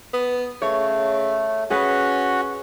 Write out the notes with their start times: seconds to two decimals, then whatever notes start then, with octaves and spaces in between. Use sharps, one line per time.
0.13 B3
0.62 C#3 A3 C#5
1.71 C#4 F#4 G#4 B4 C#5 F#5